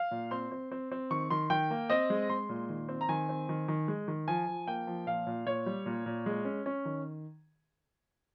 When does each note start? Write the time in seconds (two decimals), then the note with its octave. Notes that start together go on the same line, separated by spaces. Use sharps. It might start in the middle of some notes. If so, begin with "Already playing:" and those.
Already playing: F5
0.11 A#2
0.31 C4 C6
0.52 C4
0.72 C4
0.92 C4
1.11 D#3 C#6
1.30 D#3 C6
1.50 D#3 G5
1.70 A#3
1.90 C4 D#5
2.10 G#3
2.30 G#3 C6
2.49 A#2
2.69 D#3
2.89 C4
3.01 A#5
3.09 D#3 G#5
3.29 C4
3.49 D#3
3.68 D#3
3.88 G#3
4.08 D#3
4.28 F3 G#5
4.47 F3
4.67 A#3 G5
4.87 F3
5.07 A#2 F5
5.27 A#2
5.46 A#2 C#5
5.66 G3
5.86 A#2
6.06 A#2
6.26 G#3
6.45 C#4
6.66 C#4
6.85 D#3